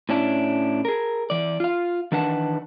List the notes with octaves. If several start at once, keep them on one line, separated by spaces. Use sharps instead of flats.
A2 C#4 D4 E4
G#4 A#4
E3 D5
F4 F5
D#3 E3 D4 B4 F#5 A5